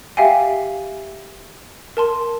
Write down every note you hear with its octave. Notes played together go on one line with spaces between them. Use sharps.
G4 E5 F5 G5 G#5
A#4 A5 C6